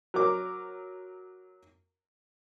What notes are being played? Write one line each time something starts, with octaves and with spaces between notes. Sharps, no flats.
F#3 A#4 D6